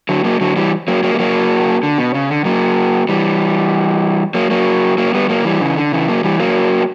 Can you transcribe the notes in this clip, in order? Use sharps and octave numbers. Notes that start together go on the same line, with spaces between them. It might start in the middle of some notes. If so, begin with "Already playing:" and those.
D3 F#3
F#3 A#3
D3 F#3
E3 G3
F#3 A#3
F#3 A#3
G3
F#3 A#3
D3
B2
C#3
D3
F#3 A#3
E3 G3
F#3 A#3
F#3 A#3
F#3 A#3
G3 B3
F#3 A#3
E3 G3
C#3 E3
D3
C#3 E3
F#3 A#3
E3 G3
F#3 A#3